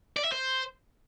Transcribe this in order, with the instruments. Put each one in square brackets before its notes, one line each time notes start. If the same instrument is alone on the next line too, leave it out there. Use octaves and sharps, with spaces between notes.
[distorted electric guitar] D5
E5
C5